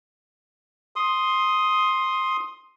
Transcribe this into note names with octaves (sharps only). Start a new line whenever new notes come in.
C6 D#6